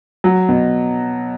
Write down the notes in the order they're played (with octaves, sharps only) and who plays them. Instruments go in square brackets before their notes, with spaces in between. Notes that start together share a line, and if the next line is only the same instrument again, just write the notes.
[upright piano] F#3
B2